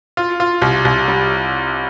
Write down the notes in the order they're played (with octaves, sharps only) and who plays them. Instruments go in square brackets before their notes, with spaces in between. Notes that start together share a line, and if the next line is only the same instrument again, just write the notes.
[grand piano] F4
F4
C2
C2
G3